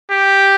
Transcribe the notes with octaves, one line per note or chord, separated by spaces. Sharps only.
G4